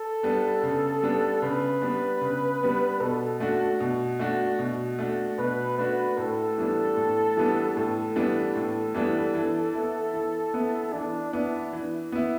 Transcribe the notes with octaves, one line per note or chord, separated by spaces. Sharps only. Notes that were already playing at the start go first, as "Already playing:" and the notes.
Already playing: A4
G3 B3 D4
C#3
G3 B3 D4
C#3 B4
G3 B3 D4
C#3
G3 B3 D4
B2 A4
A3 D4 F#4
B2
A3 D4 F#4
B2
A3 D4 F#4
B2 B4
A3 D4 F#4 B4
A2 A4
E3 G3 B3 D4
A2
E3 G3 B3 D4
A2 A4
E3 G3 B3 D4
A2
E3 G3 B3 D4
E3
B3 E4
E3
B3 E4
E3 D4
B3 D4 E4
E3
B3 E4